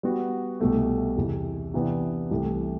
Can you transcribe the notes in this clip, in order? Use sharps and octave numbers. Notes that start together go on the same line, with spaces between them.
G3 B3 F#4
C2 B2 A3
E2 C3 E3
C3 E3 B3 D4
C2 C3 E3 A3